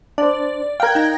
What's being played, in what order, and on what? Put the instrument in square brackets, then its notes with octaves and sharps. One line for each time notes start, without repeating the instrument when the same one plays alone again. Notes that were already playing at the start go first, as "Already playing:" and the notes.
[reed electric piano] D4 C5 [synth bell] D5
[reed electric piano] A#4 F5 [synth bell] G5 F#6 G#6
[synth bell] D#4 A#6